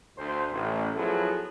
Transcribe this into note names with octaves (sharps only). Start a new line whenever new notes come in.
D2 C5
A1
F3 F#3 B3 E4 G#4 A4